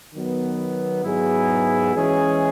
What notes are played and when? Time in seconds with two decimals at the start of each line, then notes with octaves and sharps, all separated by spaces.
0.13 D#3 F#3 B3
1.04 G#2 F#3 B3 E4 G#4
1.94 E3 G#3 C#4 G#4